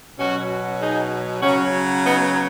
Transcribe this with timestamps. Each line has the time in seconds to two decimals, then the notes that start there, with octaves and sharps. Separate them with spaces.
0.18 B2 F#3 C#4 F#4
0.81 D#4 G#4
1.42 C#3 F#3 C#4 F#4
2.05 B3 D#4